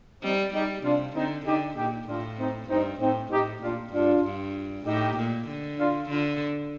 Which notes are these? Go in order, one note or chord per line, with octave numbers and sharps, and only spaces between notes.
G3 C4 D#4
G3 D#4 G4
C3 D4 F4
D3 C4 D#4
D3 D#4 G4
A#2 D#4 G4
A2 D4 F4
C4 D#4
G2 C4 D#4
A2 C4 D#4
A2 D#4 G4
A#2 D4 F4
G2 D4 F4
G2
A2 D#4 G4
A#2
D3
D4 F4
D3 D4 F4